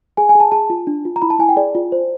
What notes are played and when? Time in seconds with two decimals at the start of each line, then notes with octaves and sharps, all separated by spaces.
0.17 G#4 G#5
0.29 G#5
0.35 G#4 A5
0.52 G#4 A5
0.70 F4
0.87 D4
1.05 F4
1.16 A#5
1.22 E4 B5
1.30 A5
1.39 E4 G#5
1.49 G5
1.56 G#4 D5
1.75 F4
1.92 C5